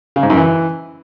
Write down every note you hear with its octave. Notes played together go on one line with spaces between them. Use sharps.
C#3
G#2
F#2
E3